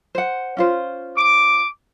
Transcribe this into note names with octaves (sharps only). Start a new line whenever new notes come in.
C5 F#5
C#4 F4 C5
D6